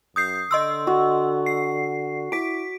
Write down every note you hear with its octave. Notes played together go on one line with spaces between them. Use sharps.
F#2 D#6 G6 C7
D3 D#5 C6 E6
F#4
C7
E4 D6 B6 D7